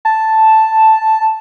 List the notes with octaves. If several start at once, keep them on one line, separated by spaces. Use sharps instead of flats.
A5